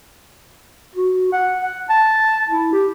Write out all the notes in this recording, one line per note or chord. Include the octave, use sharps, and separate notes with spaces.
F#4
F#5
F#5
A5
E4
G4